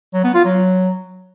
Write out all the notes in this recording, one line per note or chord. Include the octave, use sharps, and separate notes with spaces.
F#3
B3
F4
F#3